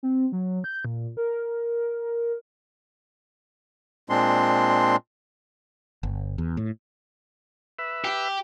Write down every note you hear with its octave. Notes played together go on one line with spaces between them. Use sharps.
C4
F#3
G6
A#2
A#4
A#2 G#3 C4 D4 C6
G1
E2
A2
B4 E5
G4